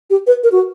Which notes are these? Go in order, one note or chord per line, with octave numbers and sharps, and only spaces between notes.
G4
B4
A#4
F#4